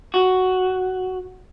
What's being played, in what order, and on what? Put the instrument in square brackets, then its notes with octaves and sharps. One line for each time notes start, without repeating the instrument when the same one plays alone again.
[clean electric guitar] F#4